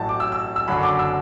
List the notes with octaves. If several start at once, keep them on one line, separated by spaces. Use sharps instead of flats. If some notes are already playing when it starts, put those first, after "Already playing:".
Already playing: A1 A2 F#3 A5
D6
E6
E6
E6
F#1 F#2 D3 F#3 B5
D6
E6